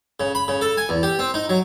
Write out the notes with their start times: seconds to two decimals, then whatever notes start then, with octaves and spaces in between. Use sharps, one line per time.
0.20 C#3
0.35 B5
0.48 C#3
0.61 A4
0.77 G#5
0.89 E2
1.03 G4
1.19 C4
1.34 D#4
1.49 F#3